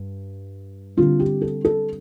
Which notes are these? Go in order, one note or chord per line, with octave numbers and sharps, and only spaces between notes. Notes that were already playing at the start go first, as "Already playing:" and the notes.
Already playing: G2
D3 G3 C4 F4
G4
A4
A4